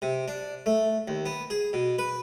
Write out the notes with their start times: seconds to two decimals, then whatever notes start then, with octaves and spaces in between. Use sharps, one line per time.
0.02 C3
0.28 D4
0.66 A3
1.08 D#2
1.26 B3
1.50 G#4
1.73 B2
1.99 B4